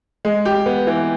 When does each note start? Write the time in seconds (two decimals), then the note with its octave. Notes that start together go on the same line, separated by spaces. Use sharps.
0.25 G#3
0.45 G4
0.66 B3
0.87 E3